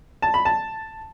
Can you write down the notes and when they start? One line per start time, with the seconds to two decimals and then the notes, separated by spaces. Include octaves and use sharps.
0.22 A5
0.34 B5
0.45 A5